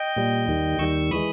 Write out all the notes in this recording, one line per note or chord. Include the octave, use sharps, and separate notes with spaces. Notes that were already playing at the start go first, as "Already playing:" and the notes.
Already playing: D#5 G5
A#2 G3
D#2 D#3 G3
D#2 D#3 G3 C#6 E6
E3 G#3 B5 D#6